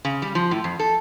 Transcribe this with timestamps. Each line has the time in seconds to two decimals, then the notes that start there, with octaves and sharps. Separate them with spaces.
0.05 C#3
0.22 G3
0.35 F3
0.51 A2
0.64 F2
0.80 A4